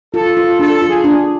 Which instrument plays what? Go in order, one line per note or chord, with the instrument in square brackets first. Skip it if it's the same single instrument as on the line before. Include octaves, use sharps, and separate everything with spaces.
[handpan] F4 [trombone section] A4
[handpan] F4
[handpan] D4 [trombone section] A4
[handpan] F4
[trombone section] G#4
[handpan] D4